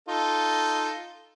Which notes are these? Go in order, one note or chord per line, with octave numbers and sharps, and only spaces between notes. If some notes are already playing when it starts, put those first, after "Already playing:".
D#4 F4 A4